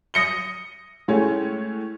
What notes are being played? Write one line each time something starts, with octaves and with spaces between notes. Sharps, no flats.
D#6 A#6 C#7 G7
A2 G#3 A3 C#4